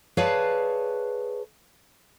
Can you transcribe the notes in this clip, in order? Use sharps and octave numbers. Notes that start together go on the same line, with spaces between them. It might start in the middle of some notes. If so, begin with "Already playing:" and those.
G#4 B4 C#5 D5 F5 A5